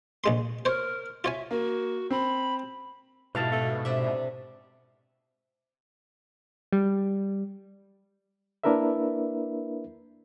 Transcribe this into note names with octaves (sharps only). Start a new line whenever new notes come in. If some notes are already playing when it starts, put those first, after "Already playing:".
A#1 G#3 C6
A#4 C5 C#5
F4 C#5 E5 G#5
A#3 F#4
C4 B5
G#2 B2 E4 G4 A4 F5 A5
A3
C3 D4 D5 E5
G3
A#3 D4 E4 A#4 B4 E5